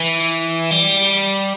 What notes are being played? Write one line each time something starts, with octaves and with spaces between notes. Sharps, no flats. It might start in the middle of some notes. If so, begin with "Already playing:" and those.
Already playing: E3
G3